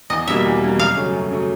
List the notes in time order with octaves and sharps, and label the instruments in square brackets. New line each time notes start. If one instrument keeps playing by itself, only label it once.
[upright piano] E2 [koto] D#5
[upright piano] B2 G3 A#3 [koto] E5
[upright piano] E2
B2 G3 A#3
[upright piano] F#2 [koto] F5
[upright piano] C#3 F#3 A3 C#4
F#2
C#3 F#3 A3 C#4